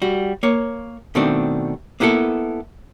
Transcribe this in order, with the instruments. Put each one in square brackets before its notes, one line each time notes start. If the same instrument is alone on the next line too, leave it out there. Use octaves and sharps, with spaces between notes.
[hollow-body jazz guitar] G3 F#4
A#3 C#5
B2 D#3 A3 C4 D4
A#3 B3 E4 G#4 A4